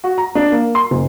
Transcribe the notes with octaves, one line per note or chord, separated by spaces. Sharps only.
F#4
A#5
D4
A#3
C6
F#1